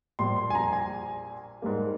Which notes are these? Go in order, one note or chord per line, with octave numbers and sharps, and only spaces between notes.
A#1 A#2 G3 C6
C6
G#5
A#5
G#5
G#2 G3 A#3